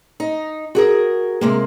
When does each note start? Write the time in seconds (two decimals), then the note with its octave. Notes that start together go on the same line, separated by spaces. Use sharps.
0.20 D#4
0.75 F#4 G#4 A#4
1.41 C3 G#3 A#3